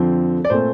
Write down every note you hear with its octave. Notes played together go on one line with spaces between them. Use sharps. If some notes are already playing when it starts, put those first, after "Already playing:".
Already playing: F2 D3 F3 C4
D5
A#2 A3 C4 C5